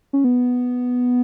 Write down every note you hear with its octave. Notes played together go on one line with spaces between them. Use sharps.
C#4
B3